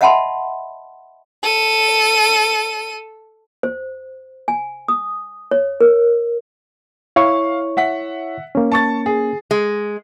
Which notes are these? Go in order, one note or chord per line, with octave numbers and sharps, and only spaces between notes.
D#5 E5 F#5 A5 B5 C6
A4 D#7
C5
G#5
D#6
C#5
A#4
E4 C#5 F5 C#6
E5 F#5 B6
A#3 C#4
A5 C#6 A6
G#4
G#3